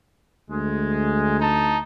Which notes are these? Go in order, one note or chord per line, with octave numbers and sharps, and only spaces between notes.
D2 G#3
D#4 A5